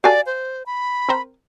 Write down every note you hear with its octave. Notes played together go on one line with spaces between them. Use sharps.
F#4 G4 A4 D5 F5 G#5
C5
B5
C4 A#4 C5